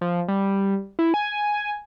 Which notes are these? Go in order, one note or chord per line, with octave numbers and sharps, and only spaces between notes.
F3
G3
E4
G#5